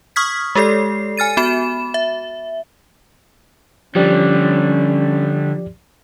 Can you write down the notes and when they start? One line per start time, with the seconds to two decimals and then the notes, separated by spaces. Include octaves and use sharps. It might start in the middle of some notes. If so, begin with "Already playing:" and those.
0.16 C#6 D#6 F6 G#6 B6
0.55 G#3 G4 A4 D5 C7
1.17 G#5 F6 A6 D#7
1.37 B3 F#4 B5 E7
1.94 E5
3.95 D3 F3 G3 C#4 G4 D5